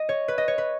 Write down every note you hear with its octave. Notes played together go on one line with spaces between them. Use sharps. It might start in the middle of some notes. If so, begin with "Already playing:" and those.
Already playing: D#5
C#5
B4
D#5
C#5
B4